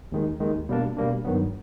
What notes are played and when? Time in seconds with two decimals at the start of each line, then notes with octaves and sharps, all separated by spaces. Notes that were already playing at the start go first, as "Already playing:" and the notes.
0.12 D#2 D#3 G#3
0.40 D#2 D#3 G#3
0.69 B2 G3 A#3 D4
0.97 B2 G3 A#3 D4
1.25 G2 D#3 F#3 B3